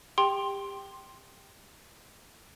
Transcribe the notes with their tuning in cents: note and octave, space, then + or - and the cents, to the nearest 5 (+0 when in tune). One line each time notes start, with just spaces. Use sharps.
G4 +25 G5 +0 C6 +10